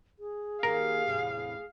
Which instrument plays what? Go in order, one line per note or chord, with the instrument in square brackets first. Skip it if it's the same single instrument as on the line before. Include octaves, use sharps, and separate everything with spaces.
[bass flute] G#4
[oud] D#3 A#3 G4 [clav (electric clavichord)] A#4 [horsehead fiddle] F5
[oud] E2 A2 C3